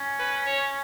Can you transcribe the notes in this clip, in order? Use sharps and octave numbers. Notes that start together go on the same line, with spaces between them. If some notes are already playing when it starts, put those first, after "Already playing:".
Already playing: C#4
B4
C#5